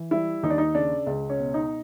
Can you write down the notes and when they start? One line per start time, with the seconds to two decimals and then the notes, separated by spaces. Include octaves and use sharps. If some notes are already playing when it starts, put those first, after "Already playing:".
Already playing: E3
0.11 G3 E4
0.43 D#2 D#4
0.50 D4
0.58 D#4
0.74 C#3 D4
1.07 C#2
1.30 C#4
1.38 B2
1.54 D#4